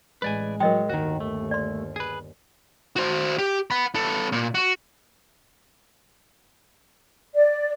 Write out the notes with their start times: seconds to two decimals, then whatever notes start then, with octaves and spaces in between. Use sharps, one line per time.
0.22 A1 G#3 B4 D5 G#5
0.60 F#3 G#3 A#4 D#5 G5
0.90 G1 D#2 D#3 F#4
1.20 A3
1.51 D5 C6
1.96 G#4 B4
2.96 F#4 C5
3.38 G4
3.71 F#5 B5
3.95 B3 A4
4.32 A#2
4.54 F#4
7.34 D5